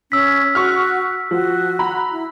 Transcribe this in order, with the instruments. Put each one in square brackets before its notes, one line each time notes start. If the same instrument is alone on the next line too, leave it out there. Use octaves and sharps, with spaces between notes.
[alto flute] C#4 [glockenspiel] E6 B6
[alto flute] F#4 [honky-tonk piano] C#6 F6
[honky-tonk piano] F3 [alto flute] F#4
[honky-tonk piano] A#5 B5
[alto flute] E4